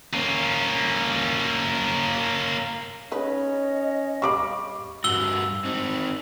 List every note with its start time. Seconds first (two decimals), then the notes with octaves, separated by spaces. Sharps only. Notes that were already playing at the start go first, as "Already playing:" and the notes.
0.13 A#3 C#4
3.12 C#4 D#4 B4 D#5
4.22 G3 F5 B5 C#6 D6
5.04 G2 F#4 E6 G7
5.65 C4 D#4